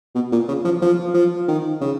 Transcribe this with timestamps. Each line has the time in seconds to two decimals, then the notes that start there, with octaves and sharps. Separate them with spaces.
0.15 B2
0.32 A#2
0.48 C#3
0.65 F3
0.82 F3
1.14 F3
1.48 D#3
1.81 C#3